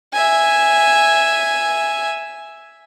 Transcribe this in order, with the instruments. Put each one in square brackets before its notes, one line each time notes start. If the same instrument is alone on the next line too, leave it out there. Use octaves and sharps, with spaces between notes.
[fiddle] E5 G#5